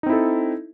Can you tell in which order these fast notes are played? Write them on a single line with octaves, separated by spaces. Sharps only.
D#4 C4 E4 A4